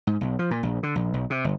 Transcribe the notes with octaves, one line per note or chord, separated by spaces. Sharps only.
G#2
B1
F3
A#2
A#1
D3
A#1
B1
C3
G1